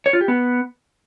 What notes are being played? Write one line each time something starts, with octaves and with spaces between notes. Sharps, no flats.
C#5
F4
G4
B3